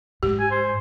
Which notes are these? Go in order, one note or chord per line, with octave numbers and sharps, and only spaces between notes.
G#2 G4
G#5
C5